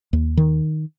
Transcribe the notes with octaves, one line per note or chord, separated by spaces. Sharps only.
D#2
D#3